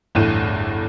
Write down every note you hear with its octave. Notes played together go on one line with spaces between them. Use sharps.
G1 E2 A2 D#7